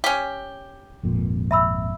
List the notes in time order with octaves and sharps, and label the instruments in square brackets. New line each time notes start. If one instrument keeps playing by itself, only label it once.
[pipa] C#4 G4
[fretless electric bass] G#1 F2 A#2
[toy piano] E5 B5 E6